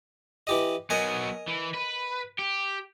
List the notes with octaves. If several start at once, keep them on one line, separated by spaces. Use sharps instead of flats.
E3 G4 D#5
F#3 B3 A#4 D#5 G#5
E3
B4
G4